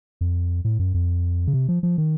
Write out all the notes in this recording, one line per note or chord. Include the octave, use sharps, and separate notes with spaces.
F2
A2
F#2
F2
C#3
C3
F3
F3
D#3